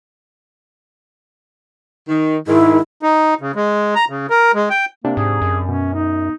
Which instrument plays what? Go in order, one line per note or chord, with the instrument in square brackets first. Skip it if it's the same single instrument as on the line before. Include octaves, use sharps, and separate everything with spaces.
[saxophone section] D#3
[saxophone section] G#2 D#3 [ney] E4
[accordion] D#4
C#3
G#3
A#5
C#3
A#4
G#3
G5
[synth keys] C3 D4 [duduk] A#3
[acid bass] G#2 [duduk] G#4
[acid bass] F#2
[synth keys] B2 [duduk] C#4
[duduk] D#4